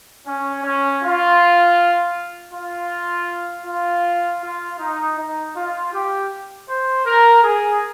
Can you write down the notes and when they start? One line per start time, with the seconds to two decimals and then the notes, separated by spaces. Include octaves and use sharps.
0.26 C#4
0.64 C#4
1.02 F4
2.53 F4
3.66 F4
4.42 F4
4.79 D#4
5.17 D#4
5.55 F4
5.93 G4
6.68 C5
7.05 A#4
7.43 G#4